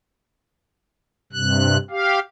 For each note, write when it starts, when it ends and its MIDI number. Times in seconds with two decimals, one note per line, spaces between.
1.33 1.77 43
1.33 1.77 48
1.33 1.77 90
1.90 2.19 67
1.90 2.19 77